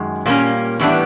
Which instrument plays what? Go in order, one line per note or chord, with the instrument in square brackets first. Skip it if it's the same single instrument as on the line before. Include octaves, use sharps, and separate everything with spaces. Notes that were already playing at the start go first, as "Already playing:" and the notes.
Already playing: [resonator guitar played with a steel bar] F#2 D#3 G#3
A#2 G3 A#3 C#4
A2 E3 G3 B3 D4